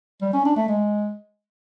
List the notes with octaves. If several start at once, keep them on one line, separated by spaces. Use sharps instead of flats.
G3
C#4
D4
A3
G#3